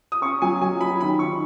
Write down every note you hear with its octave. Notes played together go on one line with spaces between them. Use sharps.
D#6
C#4 C#6
F#3 G#5
F#3 G#5
F#3 B5
D#3 B5
D#3 C#6